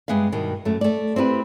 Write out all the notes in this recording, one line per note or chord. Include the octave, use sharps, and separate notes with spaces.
G2 G#3 B3 E5 F5
G2 B2 D#3
F#2 A3
A3 D5
C4 E4 G4 B4